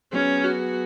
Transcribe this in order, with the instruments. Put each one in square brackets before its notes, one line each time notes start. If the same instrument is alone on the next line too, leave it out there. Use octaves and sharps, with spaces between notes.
[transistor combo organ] F#3 B3 G#4 [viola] C#4
[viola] F#4